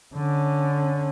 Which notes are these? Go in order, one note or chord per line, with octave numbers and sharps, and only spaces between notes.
D3 C#4